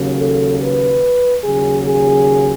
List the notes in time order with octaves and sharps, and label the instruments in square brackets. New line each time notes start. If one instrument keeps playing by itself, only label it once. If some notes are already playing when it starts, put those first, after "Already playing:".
Already playing: [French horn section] D#2 C#3 F#3
A4
B4
D#2 C#3 F#3 G#4
G#4